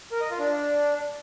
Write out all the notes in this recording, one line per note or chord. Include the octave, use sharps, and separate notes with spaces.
A#4
D#5
F4
D4